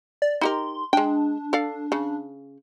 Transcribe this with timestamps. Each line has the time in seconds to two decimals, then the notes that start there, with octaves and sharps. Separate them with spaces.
0.22 D5
0.41 D#4 G4 A#4 C6
0.93 G#3 D4 G5
1.53 A4 D5 F5
1.92 C#3